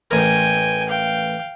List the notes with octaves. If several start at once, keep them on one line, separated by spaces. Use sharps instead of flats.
A1 A#4 G5 G#5
F5 G5